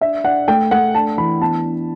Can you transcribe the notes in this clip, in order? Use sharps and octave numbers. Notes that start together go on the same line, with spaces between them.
D4 E5
D4 F#5
A3 G5
A3 F#5
D4 A5
E3 B5
B3 A5
D4